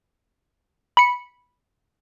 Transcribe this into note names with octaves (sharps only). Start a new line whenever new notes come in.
B5 C#7